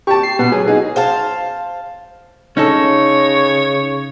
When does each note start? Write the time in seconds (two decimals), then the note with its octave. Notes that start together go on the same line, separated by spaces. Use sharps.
0.07 G4 A5 C#6
0.23 C7
0.39 B2 B3
0.52 F#3 G#4
0.67 D#4 F#4 G#4
0.96 C5 F5 A5
2.57 C#3 C#4 D#4 A4 C#5